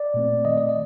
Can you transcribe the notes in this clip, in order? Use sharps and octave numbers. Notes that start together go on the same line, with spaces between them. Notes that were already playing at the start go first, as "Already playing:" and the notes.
Already playing: D5
A#2 A3 C4
D#3 A3 C4 D#5
D5
D#5